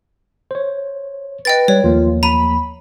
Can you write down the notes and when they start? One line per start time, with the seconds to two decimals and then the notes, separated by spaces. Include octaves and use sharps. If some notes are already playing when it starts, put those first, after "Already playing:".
0.51 C5 C#5
1.45 B4 D#5 G5 A6
1.68 G3 C#5
1.84 D#2 F3 A#3 F4
2.23 A#5 B5 D#7